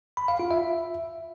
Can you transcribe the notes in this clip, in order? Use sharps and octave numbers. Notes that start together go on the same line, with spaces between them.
B5
F5
F4
E5